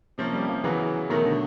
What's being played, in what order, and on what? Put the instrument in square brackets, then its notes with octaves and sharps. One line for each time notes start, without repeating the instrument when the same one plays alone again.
[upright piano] C3 F3 A#3 C#4
[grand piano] G3
F3
[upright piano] C#3 F#3 B3 [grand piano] E3
[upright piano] B2 F#3 A3 [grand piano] D#3
[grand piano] D3